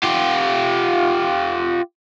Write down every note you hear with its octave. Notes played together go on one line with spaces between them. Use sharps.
F4 G4